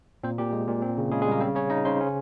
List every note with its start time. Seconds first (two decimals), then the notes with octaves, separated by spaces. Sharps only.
0.23 A#2 C4 C5
0.38 A#2 G4
0.53 G#3
0.68 A#2
0.82 C4
0.97 C#3
1.12 C#3 G#3 G#4
1.22 G#3 G#4
1.26 G3
1.31 A#3 A#4
1.41 C#3 C4 C5
1.55 C#3 C#4 C#5
1.70 C#3 D#4 D#5
1.85 C#3 C5 C6
2.00 C#4